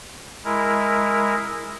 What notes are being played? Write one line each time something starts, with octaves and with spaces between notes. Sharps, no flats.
G#3 E4 A#4